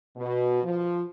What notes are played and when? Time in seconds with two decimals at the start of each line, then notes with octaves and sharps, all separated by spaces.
0.16 B2
0.63 F3